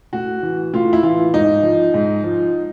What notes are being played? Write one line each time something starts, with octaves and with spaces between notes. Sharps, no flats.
A2 F#4
E3
A2 F4
E4
E3 F4
G#2 D#4
F3
G#2
F3